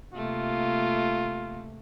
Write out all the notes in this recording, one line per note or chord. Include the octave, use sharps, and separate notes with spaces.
C3 A3 A#3 F4